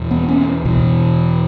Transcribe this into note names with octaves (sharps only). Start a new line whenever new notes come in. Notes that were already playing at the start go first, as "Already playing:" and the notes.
Already playing: E2 B2
B3
C#4
E2 B2